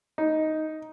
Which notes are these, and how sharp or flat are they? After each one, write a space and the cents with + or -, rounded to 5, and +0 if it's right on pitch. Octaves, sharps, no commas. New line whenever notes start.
D#4 +5